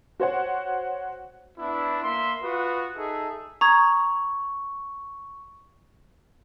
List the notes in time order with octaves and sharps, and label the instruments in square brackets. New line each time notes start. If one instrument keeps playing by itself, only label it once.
[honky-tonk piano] F#4 C5 C#5 F#5
[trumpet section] B3 D4 E4
A#3 E5 C6
F4 F#4 B4 D#6
D#4 G#4 A4 E5
[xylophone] A#5 D#6 G#6 [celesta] C#6